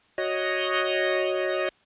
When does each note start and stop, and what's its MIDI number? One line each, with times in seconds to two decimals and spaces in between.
0.18 1.69 66
0.18 1.69 73
0.18 1.69 75
0.18 1.69 87